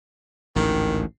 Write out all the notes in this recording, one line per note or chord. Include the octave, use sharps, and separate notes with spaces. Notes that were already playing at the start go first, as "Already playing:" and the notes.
A1 D2 G#2 D#3